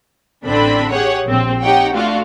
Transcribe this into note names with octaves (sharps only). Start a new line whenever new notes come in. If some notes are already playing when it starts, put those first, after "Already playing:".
A1 D3 C4 D4 B5
G4 G#4 C#5 F#5
A#1 C4
D#4 G4 C#5 F#5 G5
A3 D4 F4 F#4 F5